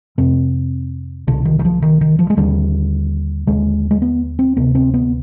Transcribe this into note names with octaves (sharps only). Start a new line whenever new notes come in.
F2 C3 C4
C2 B2 D3
D#3
D#3
F3
D#3
D#3
F3
G#3
D#2 D3 G3
D#2 D3 G#3
G#3
B3
C4
D2 C3 B3
C4
B3